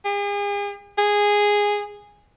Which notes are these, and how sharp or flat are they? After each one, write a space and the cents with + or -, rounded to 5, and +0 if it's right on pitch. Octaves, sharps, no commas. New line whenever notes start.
G#4 -40
G#4 -10